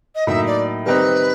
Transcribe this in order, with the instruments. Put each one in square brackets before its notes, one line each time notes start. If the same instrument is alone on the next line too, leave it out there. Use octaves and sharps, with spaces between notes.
[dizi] D#5
[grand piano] A2 F#3 A#3 D#4 [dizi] E5
[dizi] D5
[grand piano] D#3 G3 C4 D#4 [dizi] B4